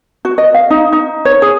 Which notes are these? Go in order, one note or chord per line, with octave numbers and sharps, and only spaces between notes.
F#4
D#5
F5
D#4
D#4
C#5
G#4